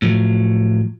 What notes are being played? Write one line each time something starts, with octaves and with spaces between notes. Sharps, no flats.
A2 F3 F#3